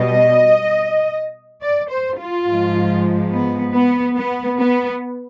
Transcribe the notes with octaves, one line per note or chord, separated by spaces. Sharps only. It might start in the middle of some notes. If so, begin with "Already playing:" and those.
Already playing: B2 G3 D#5
D5
C5
F4
G#2 F3 G#3
B3
B3
B3
B3